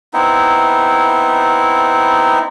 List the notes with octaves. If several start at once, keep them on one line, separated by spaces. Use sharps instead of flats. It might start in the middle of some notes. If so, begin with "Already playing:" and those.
B3 C4 D#4 E4